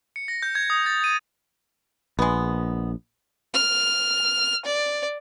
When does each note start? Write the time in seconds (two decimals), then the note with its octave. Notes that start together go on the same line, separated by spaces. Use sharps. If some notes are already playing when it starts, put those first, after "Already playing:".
0.16 C#7
0.28 A#6
0.43 G6
0.55 G#6
0.70 D#6
0.86 A6
1.04 D#7
2.19 A#1 G#3 B3
3.54 F6
4.65 D5